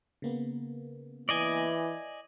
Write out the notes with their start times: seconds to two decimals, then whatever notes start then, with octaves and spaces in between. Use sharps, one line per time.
0.22 C#3 A#3 B3
1.29 E3 D5 D#5 G#5